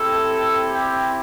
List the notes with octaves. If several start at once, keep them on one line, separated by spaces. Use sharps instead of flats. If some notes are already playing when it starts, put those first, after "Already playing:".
Already playing: C4 E4 G4 A4
G4